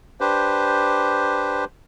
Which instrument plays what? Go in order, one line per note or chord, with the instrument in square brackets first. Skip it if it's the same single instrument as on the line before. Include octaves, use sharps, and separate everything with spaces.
[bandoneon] D4 G4 B4 C5